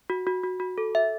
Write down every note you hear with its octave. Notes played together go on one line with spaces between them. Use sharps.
F#4
F#4
F#4
F#4
A4
E5